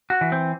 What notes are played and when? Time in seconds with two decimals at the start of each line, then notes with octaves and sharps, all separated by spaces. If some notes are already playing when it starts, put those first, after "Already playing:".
0.10 F#4
0.21 E3
0.32 C4